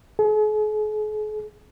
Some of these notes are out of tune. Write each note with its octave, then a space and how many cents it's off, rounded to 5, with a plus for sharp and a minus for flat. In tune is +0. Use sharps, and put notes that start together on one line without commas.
G#4 +45